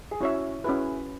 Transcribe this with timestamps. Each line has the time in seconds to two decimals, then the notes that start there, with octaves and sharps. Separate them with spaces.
0.11 G#4
0.20 C#4 E4 F#4 C#5 E5
0.64 C#4 E4 F#4 G#4 B4